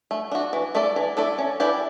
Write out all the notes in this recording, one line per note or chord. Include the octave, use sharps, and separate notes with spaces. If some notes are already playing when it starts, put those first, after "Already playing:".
A3
D4 F#4
E3
A3 E4 A4 D5
E3
A3 E4 A4 D5
C#4
E4 G4 B4 D5